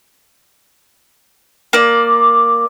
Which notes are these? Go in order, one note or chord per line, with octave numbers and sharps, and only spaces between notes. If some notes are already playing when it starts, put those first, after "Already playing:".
A#3 D5